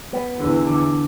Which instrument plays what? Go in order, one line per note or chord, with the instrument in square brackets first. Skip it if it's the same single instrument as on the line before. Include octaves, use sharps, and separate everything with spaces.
[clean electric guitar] B3
[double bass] E2 [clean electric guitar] D3
[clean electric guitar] D3